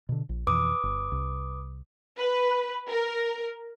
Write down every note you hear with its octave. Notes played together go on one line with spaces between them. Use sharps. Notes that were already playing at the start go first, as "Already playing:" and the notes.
B2 D3
A#1
F2 B2 E3 B4 D6 D#6
G1
C2
B4
A#4